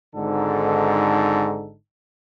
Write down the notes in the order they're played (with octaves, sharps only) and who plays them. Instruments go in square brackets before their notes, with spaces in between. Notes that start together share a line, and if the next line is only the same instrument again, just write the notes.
[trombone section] G#1 G#2 D3 D#4 A4